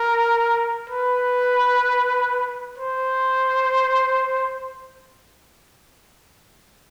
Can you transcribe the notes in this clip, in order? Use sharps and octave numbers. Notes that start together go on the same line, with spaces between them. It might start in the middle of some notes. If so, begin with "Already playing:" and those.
Already playing: A#4
B4
C5